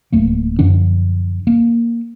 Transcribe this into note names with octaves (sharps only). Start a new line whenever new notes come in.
D1 A3 A#3
F#2 D3 F3 D4
A#3